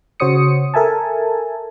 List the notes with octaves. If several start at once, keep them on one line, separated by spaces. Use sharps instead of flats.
C#3 F#4 C5 C#5 D#6 C#7
A4 A#4 E5 G#5 A5